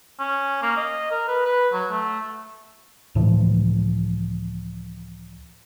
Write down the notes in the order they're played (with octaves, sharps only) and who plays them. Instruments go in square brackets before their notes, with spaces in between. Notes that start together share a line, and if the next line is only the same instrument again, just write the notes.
[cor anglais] C#4
A#3
D#5
A#4
B4
B4
F#3
A3
[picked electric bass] C#2 A2 E3 F3